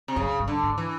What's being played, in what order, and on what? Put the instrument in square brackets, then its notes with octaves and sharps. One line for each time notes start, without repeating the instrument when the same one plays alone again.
[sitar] C3
[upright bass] F#2 [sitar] C#3
[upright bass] G2
[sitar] D3
[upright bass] G#2
[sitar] E3